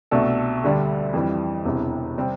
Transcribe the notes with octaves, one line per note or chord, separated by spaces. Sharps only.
C2 B2 A3 D4 A4
D2 D3 G3 D4
F2 E3 G3
E1 E2 C3 E3
C3 G3 C4